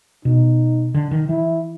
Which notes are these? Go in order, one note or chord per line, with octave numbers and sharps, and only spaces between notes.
B2 D#4
D3
D#3
E3 E4